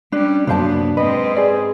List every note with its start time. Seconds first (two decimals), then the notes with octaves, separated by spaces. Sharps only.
0.12 G3 C#4 D4
0.47 C2 F#2 F#3 A#3 B3 D4 C5 A5
0.97 G#2 C4 B4 D#5
1.37 G#4 D5